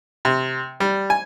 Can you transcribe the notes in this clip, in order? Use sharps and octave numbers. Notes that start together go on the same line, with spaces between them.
C3
G3
G#5